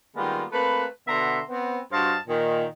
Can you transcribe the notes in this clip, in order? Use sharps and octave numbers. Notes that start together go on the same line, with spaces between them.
D#3 G3 G#3 A#3 B3 F4
A3 A#3 C4 B4
B2 D3 B3 E5 A#5 C6
B3 C4
G2 F#4 C5 D#5 F5 A5
A#2 D#3